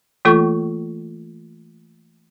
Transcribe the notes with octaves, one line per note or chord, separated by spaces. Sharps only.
E3 A3 A#3 F4 A4 C#6